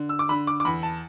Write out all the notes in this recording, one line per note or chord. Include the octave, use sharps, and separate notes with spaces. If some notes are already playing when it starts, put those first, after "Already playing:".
Already playing: D3
E6
D6
D3 B5
D6
D6
E2 B5
A5